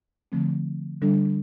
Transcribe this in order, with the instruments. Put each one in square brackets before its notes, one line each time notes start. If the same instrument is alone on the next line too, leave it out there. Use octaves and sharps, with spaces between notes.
[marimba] D3 F3 A3 C4
D3 G3 D4 A4